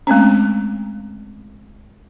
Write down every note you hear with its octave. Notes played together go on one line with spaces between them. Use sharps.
G#3 A3 C4 C#4